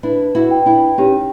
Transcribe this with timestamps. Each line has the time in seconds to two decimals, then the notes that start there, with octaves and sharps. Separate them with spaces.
0.03 D4 E4 B4
0.35 E4 F#4
0.51 G5
0.66 D4 E4
0.98 C#4 D#4 G4